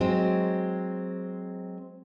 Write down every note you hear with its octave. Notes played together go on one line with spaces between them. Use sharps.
F#3 G#3 C4